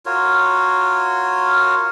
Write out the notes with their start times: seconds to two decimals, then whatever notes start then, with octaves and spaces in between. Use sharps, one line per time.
0.06 F4 F#4 A#4 C#5